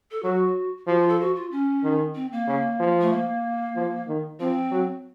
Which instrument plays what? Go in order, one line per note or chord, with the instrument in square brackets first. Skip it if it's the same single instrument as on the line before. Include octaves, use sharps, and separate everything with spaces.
[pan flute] A4
[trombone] F#3 [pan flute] F#4
[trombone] F3 [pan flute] F#4
[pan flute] F4
A4
F#4
F4
C#4
[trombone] D#3
[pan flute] C4
A#3
[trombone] C#3
F3
[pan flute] A3
A#3
[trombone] F3
D#3
[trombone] F3 [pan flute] C4
[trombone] F#3